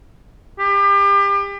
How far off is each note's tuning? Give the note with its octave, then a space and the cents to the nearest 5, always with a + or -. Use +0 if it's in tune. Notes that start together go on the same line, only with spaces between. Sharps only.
G4 +30